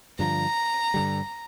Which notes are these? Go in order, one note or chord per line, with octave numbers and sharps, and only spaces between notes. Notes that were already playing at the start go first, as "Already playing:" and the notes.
G2 D3 F3 A#5
G2 D3 G3